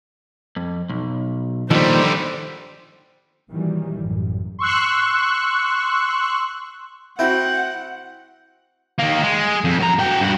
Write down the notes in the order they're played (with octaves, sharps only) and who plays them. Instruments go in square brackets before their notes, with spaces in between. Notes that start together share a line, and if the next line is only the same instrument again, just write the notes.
[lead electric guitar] F2
B1
[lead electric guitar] D#2 A#2 [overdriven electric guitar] D3 G3 [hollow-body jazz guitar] D#3 F3 [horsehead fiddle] C5
[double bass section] A#2 D#3 E3 F#3 G3
A1 F#2 A2
[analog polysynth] C6 C#6 E6 F#6
[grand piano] C4 F#4 [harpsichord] E4 [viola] F#5 [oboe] G5
[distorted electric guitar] D#3 A#3
G#3
F2
F#2 A#5
F#4 G5
G2 F#4